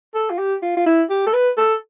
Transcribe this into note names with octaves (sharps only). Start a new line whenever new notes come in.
A4
F4
G4
F4
F4
E4
G4
A4
B4
A4